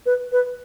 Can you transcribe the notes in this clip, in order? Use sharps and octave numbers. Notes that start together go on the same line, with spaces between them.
B4
B4